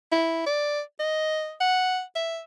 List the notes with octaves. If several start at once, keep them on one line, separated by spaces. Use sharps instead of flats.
E4
D5
D#5
F#5
E5